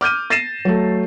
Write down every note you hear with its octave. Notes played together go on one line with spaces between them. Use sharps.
D6 F6 G6 D#7
A6 A#6 C7 D#7 E7
F#3 A3